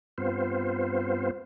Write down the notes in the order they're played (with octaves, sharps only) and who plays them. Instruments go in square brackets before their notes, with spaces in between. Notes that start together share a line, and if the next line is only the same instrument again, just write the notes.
[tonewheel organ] G2 B3 C4 F4 C5